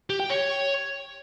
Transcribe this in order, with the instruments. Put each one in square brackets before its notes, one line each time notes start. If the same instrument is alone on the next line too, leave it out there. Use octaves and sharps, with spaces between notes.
[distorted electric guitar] G4
G5
C#5